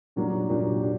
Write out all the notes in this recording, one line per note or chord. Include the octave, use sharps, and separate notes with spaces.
A#2 F#3 A#3 D4 G4
A#2 F#3 A#3 D4 G4
D4 G4